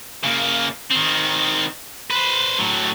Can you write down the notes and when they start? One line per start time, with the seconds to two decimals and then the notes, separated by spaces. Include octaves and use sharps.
0.23 C#3 A#3
0.91 D#3 C4
2.10 B4 C5
2.59 A2 F#3